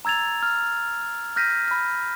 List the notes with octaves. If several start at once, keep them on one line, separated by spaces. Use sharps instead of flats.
A#5 E6 G#6 A6 F7
F6
F6 G6 A#6 B6 D#7
B5 F6